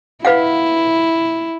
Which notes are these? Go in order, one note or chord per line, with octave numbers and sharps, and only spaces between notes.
E4 B4 F5 F#5